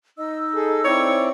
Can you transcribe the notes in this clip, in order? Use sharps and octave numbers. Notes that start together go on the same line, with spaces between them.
D#4 D#5 E6
G#4 A4
C4 E4 C#5 D5